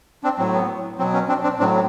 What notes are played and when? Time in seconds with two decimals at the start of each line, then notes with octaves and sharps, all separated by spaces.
0.24 C4 D4
0.38 A2 F#3 C4
0.54 B3
0.98 B2 F#3 C4
1.13 B3 C#4
1.28 C4 D4
1.43 C4 D4
1.59 A2 F#3 C4 D4